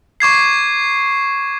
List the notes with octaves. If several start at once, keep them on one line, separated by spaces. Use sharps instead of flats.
C#6 D6 G#6 C7